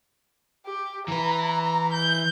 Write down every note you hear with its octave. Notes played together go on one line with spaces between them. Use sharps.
G4
E3 B4 A#5
G6